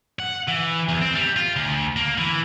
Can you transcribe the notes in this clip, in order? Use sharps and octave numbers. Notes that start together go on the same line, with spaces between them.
F#5
E3
E2
C4
G3
F4
D2
A#3
E3